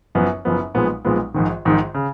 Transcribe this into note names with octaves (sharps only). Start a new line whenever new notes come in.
F#1 F#2 F3 B3
F#1 F#2 F3 B3
B1 A#2 F3 G#3 B3
B1 A#2 F3 G#3 B3
A#1 G#2 D#3
A#1 G#2 D#3
C#3